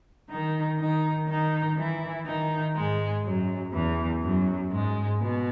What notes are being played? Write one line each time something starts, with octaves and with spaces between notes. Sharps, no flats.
D#3 D#4
D#3 D#4
D#3 D#4
E3 E4
D#3 D#4
G#2 G#3
F#2 F#3
E2 E3
F#2 F#3
G#2 G#3
B2 B3